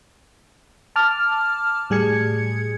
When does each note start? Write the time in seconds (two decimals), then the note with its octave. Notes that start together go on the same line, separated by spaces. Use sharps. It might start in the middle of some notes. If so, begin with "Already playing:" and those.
0.96 A5 D6 F6
1.90 A2 G3 G#4 G#6 C#7